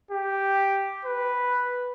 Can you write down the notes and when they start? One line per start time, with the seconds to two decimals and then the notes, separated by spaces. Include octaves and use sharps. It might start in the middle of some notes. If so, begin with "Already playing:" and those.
0.11 G4
1.05 B4